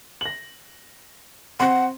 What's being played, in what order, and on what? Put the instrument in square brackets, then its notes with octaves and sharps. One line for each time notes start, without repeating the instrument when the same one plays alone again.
[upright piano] A#6 F#7
[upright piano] C4 C6 [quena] F#5